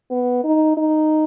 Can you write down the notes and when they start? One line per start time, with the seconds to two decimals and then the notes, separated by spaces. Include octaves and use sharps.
0.11 B3
0.44 D#4
0.77 D#4